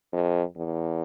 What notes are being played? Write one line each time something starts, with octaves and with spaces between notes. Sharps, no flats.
F2
E2